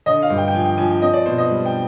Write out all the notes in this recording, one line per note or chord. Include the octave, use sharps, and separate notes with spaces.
D3 D#5
F5
G2
G5
G5
F3 G#5
G5
F3 G#5
G5
C4 D#5
D5
B2 C5
D#5
G3
G5